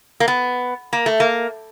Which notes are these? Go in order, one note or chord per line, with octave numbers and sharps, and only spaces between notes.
A#3
B3
A#3
A3
A#3